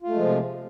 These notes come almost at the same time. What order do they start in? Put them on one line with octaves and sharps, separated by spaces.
F4 A3 G#3 F3 C3